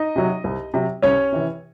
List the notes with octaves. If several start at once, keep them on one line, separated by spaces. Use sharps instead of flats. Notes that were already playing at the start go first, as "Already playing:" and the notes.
Already playing: D#4 D#5
C3 F#3
C2
C3 F#3
C2 C#4 C#5
C3 E3